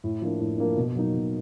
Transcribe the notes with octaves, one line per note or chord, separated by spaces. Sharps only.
A2
F3 A#3 D4
A2
F3 A#3 D4
B2
F#3 A#3 D#4
B2